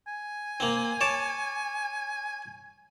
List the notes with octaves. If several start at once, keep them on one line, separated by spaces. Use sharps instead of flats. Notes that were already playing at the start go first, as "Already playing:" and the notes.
G#5
A#3 C4
C#5 A5 D6